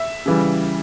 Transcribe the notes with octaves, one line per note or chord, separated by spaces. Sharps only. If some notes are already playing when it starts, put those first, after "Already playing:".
Already playing: E5
C#3 E3 G3